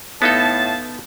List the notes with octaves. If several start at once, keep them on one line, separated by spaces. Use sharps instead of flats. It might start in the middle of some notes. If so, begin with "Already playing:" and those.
A2 B3 D#4 A4 F5 A5